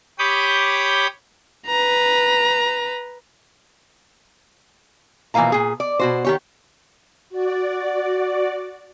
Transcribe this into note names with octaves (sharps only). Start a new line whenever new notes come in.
G4 C#5 B5 D6 D#6 G6
B4 A#5
B2 E3 F3 A#3 F5 A#5
A#2 G#4
D5
B2 F#4 C5
D#3 G4 C#5
F#4 D5